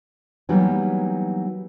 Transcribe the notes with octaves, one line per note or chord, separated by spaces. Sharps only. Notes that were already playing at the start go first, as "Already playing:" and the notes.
E3 F#3 G3 A#3 B3 D#4